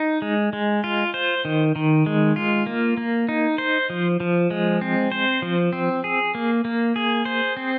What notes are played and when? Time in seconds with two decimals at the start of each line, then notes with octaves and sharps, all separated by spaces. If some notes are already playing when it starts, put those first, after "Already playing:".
Already playing: D#4
0.22 G#3
0.53 G#3
0.84 F4
1.14 C5
1.45 D#3
1.76 D#3
2.06 G#3
2.36 F4
2.66 A#3
2.97 A#3
3.29 D#4
3.58 C5
3.90 F3
4.20 F3
4.51 G#3
4.81 C4
5.12 C5
5.42 F3
5.73 C4
6.04 G#4
6.35 A#3
6.65 A#3
6.96 G#4
7.25 C5
7.57 C4